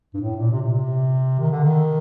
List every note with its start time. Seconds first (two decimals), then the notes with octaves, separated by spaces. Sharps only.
0.14 G2
0.21 A2
0.36 A#2
0.51 C3
0.62 A#2
0.73 C3
1.39 D#3
1.51 D3
1.64 D#3